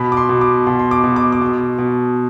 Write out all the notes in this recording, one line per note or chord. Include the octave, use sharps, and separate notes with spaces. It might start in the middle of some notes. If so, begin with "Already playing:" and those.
Already playing: B2 B5
D6
C6
B2
D6
B2 C6
C6
D6
B2
D6
D6
B2 C6
B2